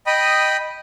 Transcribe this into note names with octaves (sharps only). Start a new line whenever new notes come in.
D#5 G5 B5 D#6